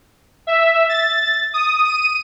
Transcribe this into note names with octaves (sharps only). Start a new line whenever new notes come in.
E5
A6
D#6
D#7